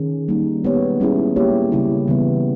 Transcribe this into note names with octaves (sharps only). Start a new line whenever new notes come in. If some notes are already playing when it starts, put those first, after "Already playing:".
Already playing: D#3 C#4 G#4
G3 A#3 D#4
G#3 B3 G4 C#5
G3 C#4 E4 G#4
A#3 E4 G4 C#5
C#3 G3 C#4 E4
C#3 E3 G3 B3